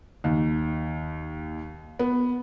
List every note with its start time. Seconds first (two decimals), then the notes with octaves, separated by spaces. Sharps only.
0.24 D#2
1.99 B3